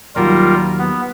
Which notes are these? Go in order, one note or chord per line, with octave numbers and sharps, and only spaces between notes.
D#2 F#3 G3 F4 A#4
B3